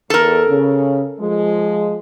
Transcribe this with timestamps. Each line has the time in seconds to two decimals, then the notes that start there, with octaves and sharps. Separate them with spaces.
0.10 E2 A4 A#4
0.48 C#3
1.20 F3 G#3